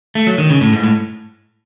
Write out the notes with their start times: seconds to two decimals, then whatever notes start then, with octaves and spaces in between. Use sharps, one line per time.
0.15 A3
0.27 F#3
0.38 D#3
0.50 C#3
0.61 A2
0.72 G#2
0.83 A2